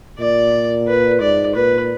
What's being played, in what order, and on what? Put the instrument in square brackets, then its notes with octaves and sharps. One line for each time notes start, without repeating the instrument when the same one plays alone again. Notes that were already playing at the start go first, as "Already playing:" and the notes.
[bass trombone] A#2 [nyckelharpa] D5
[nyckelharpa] B4
[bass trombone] G#2 [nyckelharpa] D5
[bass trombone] A#2 [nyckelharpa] B4